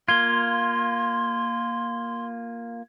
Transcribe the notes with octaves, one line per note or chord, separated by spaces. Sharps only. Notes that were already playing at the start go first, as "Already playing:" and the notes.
A#3 F4 C6 G#6 G7